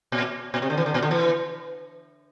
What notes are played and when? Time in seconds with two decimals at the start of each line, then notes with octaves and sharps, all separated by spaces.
0.12 A#2
0.54 A#2
0.62 C3
0.70 D3
0.77 E3
0.86 D3
0.94 A#2
1.02 D3
1.11 E3